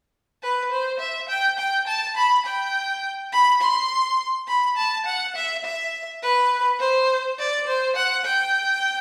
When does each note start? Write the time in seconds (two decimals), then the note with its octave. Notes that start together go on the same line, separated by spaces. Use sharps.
0.43 B4
0.71 C5
1.00 E5
1.29 G5
1.59 G5
1.87 A5
2.16 B5
2.46 G5
3.32 B5
3.61 C6
4.48 B5
4.77 A5
5.06 F#5
5.36 E5
5.65 E5
6.23 B4
6.80 C5
7.39 D5
7.67 C5
7.96 F#5
8.25 G5